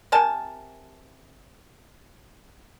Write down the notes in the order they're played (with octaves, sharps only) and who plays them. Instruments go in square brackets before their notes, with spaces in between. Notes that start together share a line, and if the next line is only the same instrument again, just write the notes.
[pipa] C3 A#4 G#5 A5